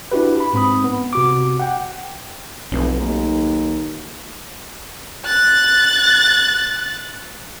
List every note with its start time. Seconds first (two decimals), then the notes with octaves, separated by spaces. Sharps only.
0.12 D4 E4 F#4 G4 B4
0.40 B5
0.53 G#2 C4 B5 D#6
0.84 B3
1.13 C3 F#4 D6
1.60 F#5 G5
2.72 F1 B1
3.00 D#2
5.25 F#6 A6